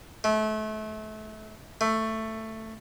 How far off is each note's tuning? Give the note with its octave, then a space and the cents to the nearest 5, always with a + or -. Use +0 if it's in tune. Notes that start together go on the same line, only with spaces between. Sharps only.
A3 -30
A3 +10